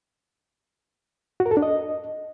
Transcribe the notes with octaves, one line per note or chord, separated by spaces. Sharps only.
F#4
A#4
A4
D4
D#5